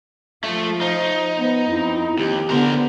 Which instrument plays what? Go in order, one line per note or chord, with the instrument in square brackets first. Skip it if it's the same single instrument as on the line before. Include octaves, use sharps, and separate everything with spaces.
[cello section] F3 F4 [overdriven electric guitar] A3
[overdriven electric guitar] D#4 [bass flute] C5
[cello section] B3
[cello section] F2 C4 [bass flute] E4
[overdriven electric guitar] D#2 [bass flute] G4
[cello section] D3 B3 [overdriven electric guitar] A#4 C5